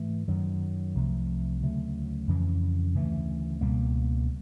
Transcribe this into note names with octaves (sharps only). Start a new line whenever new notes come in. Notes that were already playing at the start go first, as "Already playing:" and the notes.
Already playing: G#2 E3 A3
F#2 D#3 F#3
C2 C3 F3 A3
D2 C#3 F#3 A3
F2 C#3 E3
D2 C#3 E3 A3
C#2 B2 G3 A#3